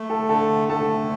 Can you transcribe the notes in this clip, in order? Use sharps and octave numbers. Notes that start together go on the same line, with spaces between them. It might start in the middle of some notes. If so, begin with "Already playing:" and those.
Already playing: A3
A4 A5
D3 A4 A5
A3 A4 A5